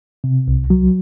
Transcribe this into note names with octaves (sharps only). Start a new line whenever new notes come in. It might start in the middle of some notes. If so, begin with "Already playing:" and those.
C3
C2
F#3